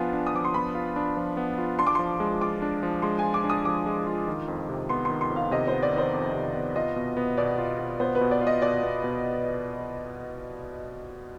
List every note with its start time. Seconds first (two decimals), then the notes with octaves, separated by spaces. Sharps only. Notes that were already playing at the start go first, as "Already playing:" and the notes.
Already playing: F3 B3 D4 F4 G#5
0.13 D4
0.27 D#6
0.34 F3 D6
0.45 C6
0.54 B3 B5
0.75 F4
0.96 D4
1.17 F3
1.37 B3
1.58 F4
1.79 D4 C6
1.87 D6
1.95 F3 C6
2.20 G#3
2.41 F4 D6
2.62 D4
2.83 F3
3.02 G#3 C6
3.19 F4 G#5
3.34 D6
3.44 D4
3.50 D#6
3.65 F3 D6
3.86 G#3
4.07 F4
4.27 D#3
4.48 F2
4.69 C3
4.89 B3 C6
5.05 D#3 C6
5.21 C6
5.30 F2
5.36 F5
5.51 C3 D#5
5.67 C5
5.73 B3
5.83 D5
5.92 D#3
5.98 C5
6.13 F2
6.34 C3
6.55 B3
6.76 F4 D#5
6.96 B2
7.17 B3
7.37 B2 D5
7.58 F4
7.79 B2
8.00 B3 C5
8.15 B4
8.21 B2
8.31 D5
8.41 F4
8.47 D#5
8.62 B2 D5
8.83 B3
9.04 B2